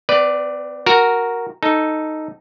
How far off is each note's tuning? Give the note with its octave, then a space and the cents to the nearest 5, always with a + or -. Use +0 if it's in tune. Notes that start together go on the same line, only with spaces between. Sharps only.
C4 -45 B4 +0 D5 +0
F#4 +0 A#4 +0
D#4 +0 A4 +0